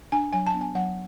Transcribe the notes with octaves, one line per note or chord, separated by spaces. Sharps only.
D4 G#5
F#3 G#5
A5
B3 D4
G#5
F#3 F#5